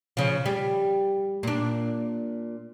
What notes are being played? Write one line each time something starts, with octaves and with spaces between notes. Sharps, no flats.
C#3 F3
G3
A#2 D4